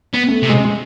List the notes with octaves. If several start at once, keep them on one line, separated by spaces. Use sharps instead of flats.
B3
A3
C3
G#3
G#3